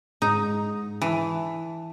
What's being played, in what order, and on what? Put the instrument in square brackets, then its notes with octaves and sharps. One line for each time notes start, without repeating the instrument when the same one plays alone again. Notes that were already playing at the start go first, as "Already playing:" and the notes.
[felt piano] G#2 [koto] D#4
[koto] E3 [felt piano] A5